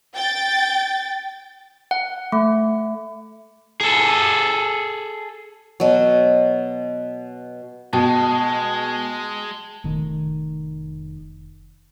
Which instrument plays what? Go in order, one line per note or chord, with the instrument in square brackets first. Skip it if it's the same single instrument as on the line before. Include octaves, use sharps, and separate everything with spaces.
[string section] G5 A6
[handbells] F#5
A3
[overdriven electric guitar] G#4 A4
[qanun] B2 F#3
[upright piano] B2 [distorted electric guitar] G#3 [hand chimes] G5 A5
[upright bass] F1 D#3